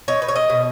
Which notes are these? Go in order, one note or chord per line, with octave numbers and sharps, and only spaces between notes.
D#4 C#5
B4
C#5
D#5
B2